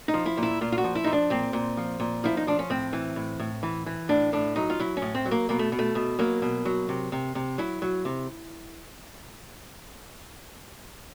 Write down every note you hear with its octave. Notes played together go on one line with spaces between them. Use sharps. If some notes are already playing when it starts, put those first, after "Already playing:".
D#4
F3
E4
A#2
E4
A#2 F4
F4
F#4
F3
E4
F3 D#4
D4
A#2 C4
A#2
F3
A#2
F3 E4
D#4
F3 D4
C#4
A2 C4
E3
A2
A2
E3
E3
A2 D4
A2 D4
F#3 D#4
F4
F#3 E4
C#4
A2
C4
F#3
A#3
B2 A#3
A3
B2
A3
B2
F#3 A#3
B2
F#3
C3
C3
C3
F#3 E4
F#3
C3